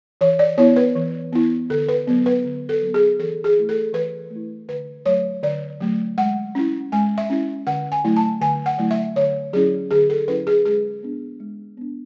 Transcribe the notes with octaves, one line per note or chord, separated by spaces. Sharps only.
E3 C#5
D5
B3 E4 C#5
B4
E3
B3 E4
D3 A4
B4
F#3 B3
B4
D3
A4
F#3 B3
G#4
E3 A4
G#4
A3 E4
A4
E3 B4
A3 E4
D3 B4
F#3 A3 C#5
D3 D5
F#3 A3
G#3 F#5
C#4 E4
G#3 G#5
E5
C#4 E4
D3 F#5
G#5
F#3 A3 E4
A5
D3 G#5
F#5
F#3 A3 E4
E5
D3 C#5
F#3 C#4 E4 G#4
D3 G#4
A4
F#3 C#4 E4 B4
G#4
G#3 G#4
B3 D4
G#3
B3 D4